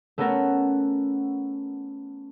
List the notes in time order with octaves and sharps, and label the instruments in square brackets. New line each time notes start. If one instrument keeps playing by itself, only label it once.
[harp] A3 B3 C#4 A4 A#4 F#5